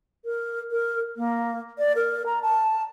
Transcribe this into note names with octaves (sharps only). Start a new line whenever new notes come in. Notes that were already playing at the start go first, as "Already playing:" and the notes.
A#4
A#4
A#3
D5
A#4
A#5
A5